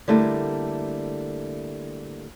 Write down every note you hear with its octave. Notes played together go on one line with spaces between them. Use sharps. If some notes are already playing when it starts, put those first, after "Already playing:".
D3 G3 A3 A#3 E4